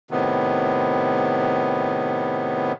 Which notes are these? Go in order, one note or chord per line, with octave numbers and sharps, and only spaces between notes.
A2 C3 D#3 B3